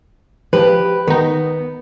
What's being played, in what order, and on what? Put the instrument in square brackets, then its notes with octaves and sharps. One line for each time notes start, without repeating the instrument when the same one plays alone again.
[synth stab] F3 [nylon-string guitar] G4 B4
[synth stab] D#3 D#4 [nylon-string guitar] B3